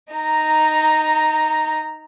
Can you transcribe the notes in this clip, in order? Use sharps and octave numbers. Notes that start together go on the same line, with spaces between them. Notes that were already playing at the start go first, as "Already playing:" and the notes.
D#4 A#5